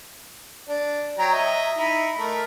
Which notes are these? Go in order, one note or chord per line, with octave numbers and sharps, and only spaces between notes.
D4
F#3 G5 A#5
D#5 E5
D#4 E4
A3 A#4